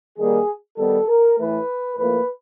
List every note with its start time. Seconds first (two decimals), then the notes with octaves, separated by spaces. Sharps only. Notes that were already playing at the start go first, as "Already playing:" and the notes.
0.18 D#3 G3 A#3 G#4
0.77 D#3 G3 B3 A4
1.08 A#4
1.37 A2 E3 A3 B4
1.96 A2 F3 A#3 B4